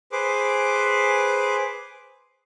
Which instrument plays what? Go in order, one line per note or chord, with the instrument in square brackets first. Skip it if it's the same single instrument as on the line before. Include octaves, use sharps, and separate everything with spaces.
[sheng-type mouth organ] G#4 B4 C5 D6